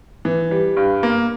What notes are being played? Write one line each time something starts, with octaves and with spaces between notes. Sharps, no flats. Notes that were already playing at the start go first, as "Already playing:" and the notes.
E3
G3
G2
A#3